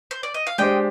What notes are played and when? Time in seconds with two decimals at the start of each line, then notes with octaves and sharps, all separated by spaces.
0.11 C5
0.23 D5
0.34 D#5
0.47 F5
0.58 G#3 D4 G4 C5 D#5 G5